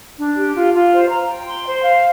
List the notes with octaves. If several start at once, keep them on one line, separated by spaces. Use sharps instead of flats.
D4
G4
F4
F4
C5
A#5
G5
C6
C5
F5